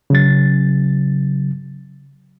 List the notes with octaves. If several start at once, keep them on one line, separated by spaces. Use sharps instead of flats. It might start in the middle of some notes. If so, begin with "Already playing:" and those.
C#3 F#3 A6